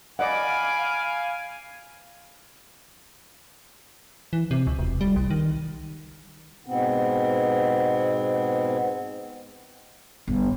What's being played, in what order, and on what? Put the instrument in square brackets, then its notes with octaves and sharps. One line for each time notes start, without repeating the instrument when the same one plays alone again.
[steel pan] D5 D#5 F#5 [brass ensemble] F5 [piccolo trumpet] G#5 [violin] B5 D6
[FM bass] E3
C3
C#2
E1
G3
C2
D#3
[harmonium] G#2 B2 B3 C4
[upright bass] G1